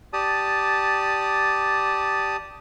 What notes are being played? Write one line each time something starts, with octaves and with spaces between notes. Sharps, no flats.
G4 D5 A5 D#6